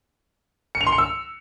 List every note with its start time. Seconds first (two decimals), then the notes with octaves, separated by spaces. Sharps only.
0.75 C#7
0.81 F7
0.87 C6
0.92 C#7
0.98 E6